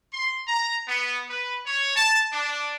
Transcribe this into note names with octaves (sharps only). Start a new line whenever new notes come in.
C6
A#5
B3
B4
C#5
A5
D4